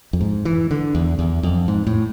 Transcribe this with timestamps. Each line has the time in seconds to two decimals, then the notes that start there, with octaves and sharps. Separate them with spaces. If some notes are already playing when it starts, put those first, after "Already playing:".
0.13 F2
0.21 G#2
0.45 E3
0.71 D3
0.95 E2
1.19 E2
1.43 F2
1.68 G#2
1.87 A2